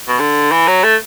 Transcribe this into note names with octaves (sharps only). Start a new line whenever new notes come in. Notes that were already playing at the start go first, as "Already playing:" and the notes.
B2
D3
E3
F#3
A3